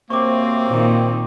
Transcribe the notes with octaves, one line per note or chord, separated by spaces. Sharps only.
F#2 C3 A#3 C4 C#6 D6
A#2 D#3